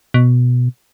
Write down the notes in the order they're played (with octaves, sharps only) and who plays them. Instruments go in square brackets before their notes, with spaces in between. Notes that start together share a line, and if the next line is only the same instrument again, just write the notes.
[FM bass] B2